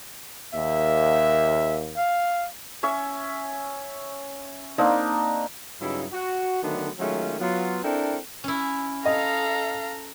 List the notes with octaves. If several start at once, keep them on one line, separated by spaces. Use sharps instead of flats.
D#2 A#3 E5
F5
C#4 C#5 E5
A#3 C4 D4 D#4
G2 C#3 F#3 D#4 E4
F#4
D3 D#3 F#3 A3 B3 D4
D#3 F#3 G#3 A3 C#4 F4
F#3 B3 F4
C4 D4 E4 A4 A#4 G5
C#4 E4
A4 D#5 F5 A#5